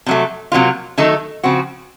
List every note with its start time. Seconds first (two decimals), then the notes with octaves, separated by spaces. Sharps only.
0.06 C3 F#3 A3
0.52 C3 F#3 A#3 F4
0.98 D#3 F#3 A3 D#4 A4
1.43 C#3 F3 C4 F#4